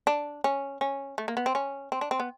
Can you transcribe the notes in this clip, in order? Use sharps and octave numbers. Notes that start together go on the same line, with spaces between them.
D4
C#4
C#4
A3
A#3
B3
C4
C#4
C4
D4
C4
B3